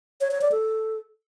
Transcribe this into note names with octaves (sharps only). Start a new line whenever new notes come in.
C#5
C#5
D5
A4